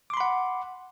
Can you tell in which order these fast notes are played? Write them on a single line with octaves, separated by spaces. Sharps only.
D6 C6 B5 F#5